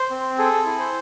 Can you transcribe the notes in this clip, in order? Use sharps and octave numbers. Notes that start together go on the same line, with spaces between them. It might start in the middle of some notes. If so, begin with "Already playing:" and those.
Already playing: C5
C4
G#4 A4
E4
C5